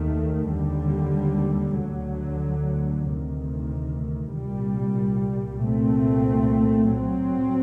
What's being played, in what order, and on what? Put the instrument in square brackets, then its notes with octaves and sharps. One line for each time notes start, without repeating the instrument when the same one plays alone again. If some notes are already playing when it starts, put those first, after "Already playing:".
Already playing: [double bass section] D#2 D#3 A3
D#2 D3 G3
D2 D3 F#3
D2 C3 D#3
C2 A#2 G3
C2 A#2 A3 C4
A2 F#3 C4